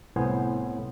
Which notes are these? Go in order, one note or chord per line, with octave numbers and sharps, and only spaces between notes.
C2 A2 B3 C5 G#5